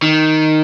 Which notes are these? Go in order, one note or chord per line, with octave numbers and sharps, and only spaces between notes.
D#3